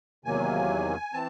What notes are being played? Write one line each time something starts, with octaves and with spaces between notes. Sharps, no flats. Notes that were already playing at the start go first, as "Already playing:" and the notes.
E2 C3 D#3 F#3 A#3 G#5
E3 C4 A5